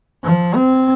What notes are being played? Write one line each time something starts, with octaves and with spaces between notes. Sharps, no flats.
F3
C4